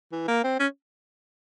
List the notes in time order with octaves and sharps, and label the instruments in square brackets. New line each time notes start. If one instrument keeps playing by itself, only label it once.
[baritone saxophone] E3
A#3
C4
C#4